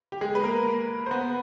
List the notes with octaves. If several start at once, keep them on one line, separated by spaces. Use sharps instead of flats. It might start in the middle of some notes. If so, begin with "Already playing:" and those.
G4
G#3 G#4
B4
A#3 A#4
C5
B3 B4